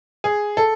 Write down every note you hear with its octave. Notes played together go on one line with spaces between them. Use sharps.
G#4
A4